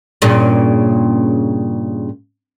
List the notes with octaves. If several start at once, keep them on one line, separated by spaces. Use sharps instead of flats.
G2 A#2 C#3